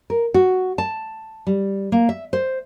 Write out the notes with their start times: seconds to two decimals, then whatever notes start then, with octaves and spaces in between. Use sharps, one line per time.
0.10 A#4
0.34 F#4
0.78 A5
1.47 G3
1.92 A#3
2.09 E5
2.33 C5